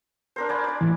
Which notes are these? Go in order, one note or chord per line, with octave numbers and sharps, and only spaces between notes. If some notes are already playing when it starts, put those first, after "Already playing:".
D4 A#4 C5
D5 G#5 B5
D5 D6
A2 E3